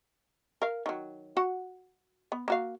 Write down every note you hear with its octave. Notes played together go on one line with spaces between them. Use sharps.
A#4 F5
D#3 F#3
F#4 F#5
B3
A#3 F#4 F5